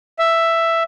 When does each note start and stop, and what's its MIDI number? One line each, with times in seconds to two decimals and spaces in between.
0.19 0.83 76